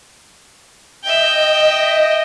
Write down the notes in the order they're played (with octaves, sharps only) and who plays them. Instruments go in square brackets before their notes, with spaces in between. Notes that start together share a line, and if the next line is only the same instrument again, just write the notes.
[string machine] D#5 [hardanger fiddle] E5 G5